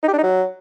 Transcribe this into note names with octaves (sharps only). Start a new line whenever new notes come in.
D#4
G4
D4
D#4
F#3